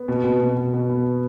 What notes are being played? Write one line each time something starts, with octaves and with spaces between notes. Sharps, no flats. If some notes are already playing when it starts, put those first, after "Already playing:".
Already playing: B3
B2
B2
B2
B2
B2
B3